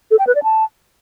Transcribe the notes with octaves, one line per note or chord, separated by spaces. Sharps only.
A4
G5
B4
D5
A5